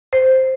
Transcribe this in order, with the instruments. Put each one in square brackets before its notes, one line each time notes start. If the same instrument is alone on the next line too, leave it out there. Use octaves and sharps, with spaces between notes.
[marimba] C5